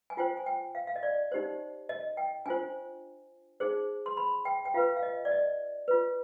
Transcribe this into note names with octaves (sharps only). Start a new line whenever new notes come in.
G#5
F4 C5 G5
G#5
G5
F5
F5
D#5
D5
D#4 G4 C5
D#5
G5
D4 F4 C5 G#5
D#4 G#4 C5
C6
B5
G5
G5
F4 B4 F5
F5
D#5
D5
D#5
F4 B4